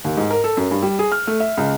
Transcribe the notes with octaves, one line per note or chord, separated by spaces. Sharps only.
D#2
G#2
A#4
A4
F#2
G2
G3
G#4
F6
A3
E5
C#2